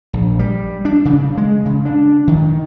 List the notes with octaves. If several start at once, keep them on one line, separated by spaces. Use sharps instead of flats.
A#1
G3
D4
C#3
G#3
C#3
D4
D#3